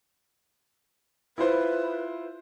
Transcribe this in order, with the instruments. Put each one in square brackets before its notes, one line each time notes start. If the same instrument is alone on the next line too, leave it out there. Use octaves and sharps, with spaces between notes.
[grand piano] E4 F4 C5 [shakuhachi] B4